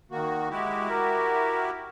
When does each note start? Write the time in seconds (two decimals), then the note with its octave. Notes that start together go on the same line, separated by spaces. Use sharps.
0.11 D#3 A#3 F#4
0.50 G#3 E4 F#4 G4
0.90 A#4